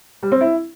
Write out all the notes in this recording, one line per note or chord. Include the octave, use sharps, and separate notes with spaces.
G3
C4
E4